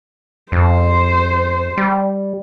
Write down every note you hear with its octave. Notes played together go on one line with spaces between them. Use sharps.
F2 C5
G3